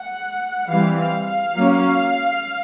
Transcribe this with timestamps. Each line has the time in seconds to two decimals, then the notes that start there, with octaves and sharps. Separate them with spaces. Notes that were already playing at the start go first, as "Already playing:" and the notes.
Already playing: F#5
0.69 E3 G3 C4 F5
0.97 F5
1.25 F5
1.54 F#3 A#3 C#4